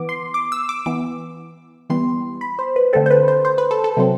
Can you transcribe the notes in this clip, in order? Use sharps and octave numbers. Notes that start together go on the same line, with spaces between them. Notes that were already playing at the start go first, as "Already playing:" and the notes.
Already playing: E3 B3 D6
C6
D6
E6
D6
E3 B3 D6
E3 G3 B3 C6
B5
C5
B4
D3 A3 C4 A4
C5
B4
C5
C5
B4
A4
A4
C3 F#3 C4